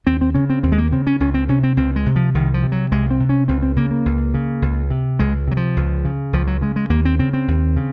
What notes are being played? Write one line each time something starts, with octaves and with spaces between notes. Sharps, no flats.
D#2 C4
C4
C#3 C#4
C4
D#2 C4
G#3
A#3
C#3 C4
C#4
C#2 C#4
C4
C3 C#4
C4
C#2 C4
G#3
C3
F3
C2 D#3
F3
C3
F#3
C2 G#3
C4
C3
C#4
C#2 C4
C4
C#3 A#3
A#3
C#2
C#3
C#2
C3
C#2 G#3
C3 F#3
F3
C#2
C#3
C#2 F3
F#3
C#3 G#3
G#3
D#2 A#3
C4
C#3 C4
C4
D#2
C#3